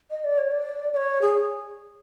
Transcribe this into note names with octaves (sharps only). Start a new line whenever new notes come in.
D#5
D5
C#5
D5
D5
C#5
G#4